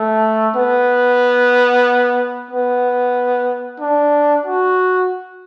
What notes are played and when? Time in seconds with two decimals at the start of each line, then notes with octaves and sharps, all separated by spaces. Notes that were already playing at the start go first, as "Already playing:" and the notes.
Already playing: A3
0.56 B3
2.51 B3
3.80 D4
4.46 F#4